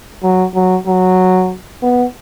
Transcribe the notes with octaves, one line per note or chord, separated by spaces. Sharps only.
F#3
F#3
F#3
B3